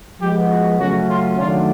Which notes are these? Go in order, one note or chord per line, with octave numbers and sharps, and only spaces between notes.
F3 G#3 B3 G4
F#4
C#3 F#3 A3 C#4 F#4
F4
D#3 F#3 A3 D4 F4